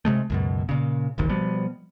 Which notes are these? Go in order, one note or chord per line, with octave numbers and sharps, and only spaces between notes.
C3 G#3 A3
C#2 F#2 B2
A#2 C#3
D#1 G#1 D2 D#3
B2 F3 G3 B3